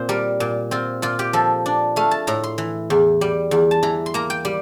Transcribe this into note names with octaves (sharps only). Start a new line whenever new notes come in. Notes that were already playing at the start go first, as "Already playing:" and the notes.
Already playing: A#2 C4 C5
G3 A#4
A#2
C4 F4
A#2 F4
G4
F3 A4
D4
A3 F5
A5
A2 A#5
C6
E3
E2
G3
E2
A5
E3 A#5
C6
A#3 A#5
G5
G3